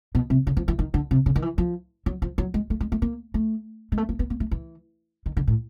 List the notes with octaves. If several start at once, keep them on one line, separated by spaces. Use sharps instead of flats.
B2
C3
C#3
F3
E3
D#3
D3
C3
C#3
D#3
E3
F3
F#3
F3
F#3
G#3
A3
G#3
A3
A#3
A3
G#3
A3
A#3
B3
A#3
A3
E3
D#3
D3
A2